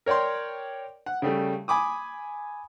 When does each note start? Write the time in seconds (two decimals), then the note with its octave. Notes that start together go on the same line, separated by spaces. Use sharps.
0.06 A#4 C#5 D5 G5 C6
1.06 F#5
1.22 C#3 G3 A3
1.68 G#5 B5 D6 D#6